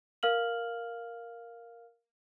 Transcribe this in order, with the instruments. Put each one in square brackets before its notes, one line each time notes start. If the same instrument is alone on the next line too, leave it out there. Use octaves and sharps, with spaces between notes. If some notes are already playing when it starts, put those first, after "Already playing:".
[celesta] A#4 F5 F6 F#7